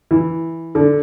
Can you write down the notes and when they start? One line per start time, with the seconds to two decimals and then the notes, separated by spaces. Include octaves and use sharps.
0.11 E3
0.75 D3